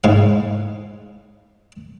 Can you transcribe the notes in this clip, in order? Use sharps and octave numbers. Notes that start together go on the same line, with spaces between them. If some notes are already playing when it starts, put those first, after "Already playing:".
G#2 F5